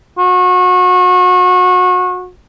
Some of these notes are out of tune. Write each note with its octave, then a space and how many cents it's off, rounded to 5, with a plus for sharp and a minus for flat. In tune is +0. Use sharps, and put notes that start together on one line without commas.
F#4 -30